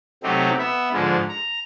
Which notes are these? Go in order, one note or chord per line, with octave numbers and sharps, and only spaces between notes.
C3 F#3 A3 C4 D#4 G4
B3 E5
G#2 D3 F3 G#3
A#5